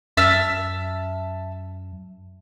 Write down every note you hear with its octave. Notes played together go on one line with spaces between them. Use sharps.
F#2 E5 A5 F6